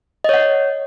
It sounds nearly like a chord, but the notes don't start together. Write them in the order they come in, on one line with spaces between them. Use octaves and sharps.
D#5 C#5 F#5